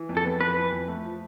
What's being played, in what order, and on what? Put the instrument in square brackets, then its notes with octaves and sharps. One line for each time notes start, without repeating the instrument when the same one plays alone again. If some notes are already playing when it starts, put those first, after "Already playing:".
Already playing: [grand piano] E3
F2
[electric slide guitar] A4
[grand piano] B3
[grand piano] F2 [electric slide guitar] B4
[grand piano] E3
F2
A3
F3